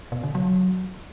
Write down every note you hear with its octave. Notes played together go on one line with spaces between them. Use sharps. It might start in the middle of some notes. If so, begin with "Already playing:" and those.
B2
D3
F#3